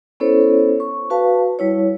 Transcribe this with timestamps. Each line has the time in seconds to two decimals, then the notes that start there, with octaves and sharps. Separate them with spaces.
0.20 B3 C#4 E4 A4 C5 C#5
0.80 C#6
1.10 F#4 B4 F5 A5
1.59 G3 E4 C#5